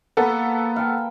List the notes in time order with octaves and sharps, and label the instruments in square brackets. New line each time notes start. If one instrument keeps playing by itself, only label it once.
[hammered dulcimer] A#3 B4 [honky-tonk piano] B3 A4
[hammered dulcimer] F5 G5 A5